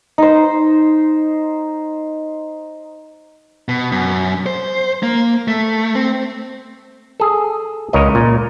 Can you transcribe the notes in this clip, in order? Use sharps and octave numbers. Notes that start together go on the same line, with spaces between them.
D#4 C5
B2
F#2
C5
A#3
A3
C4
G#4 A4
C#2 A#4 C#5 D#5
A#2